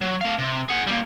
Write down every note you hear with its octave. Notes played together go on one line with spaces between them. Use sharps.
F#3
A3 F5
C3
G#4 F#5
G3 A#3